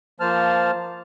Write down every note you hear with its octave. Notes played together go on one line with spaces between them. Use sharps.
F3 A#3 C5 A5 F6